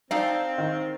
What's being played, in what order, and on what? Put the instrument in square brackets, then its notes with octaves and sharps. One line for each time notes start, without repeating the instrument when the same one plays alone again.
[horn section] C4 [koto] D#4 A4 D5 [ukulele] F5
[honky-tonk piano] D#3